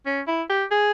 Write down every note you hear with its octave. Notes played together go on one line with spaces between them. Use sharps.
C#4
E4
G4
G#4